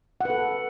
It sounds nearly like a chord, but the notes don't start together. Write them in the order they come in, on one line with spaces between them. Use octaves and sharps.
F#5 B4 A4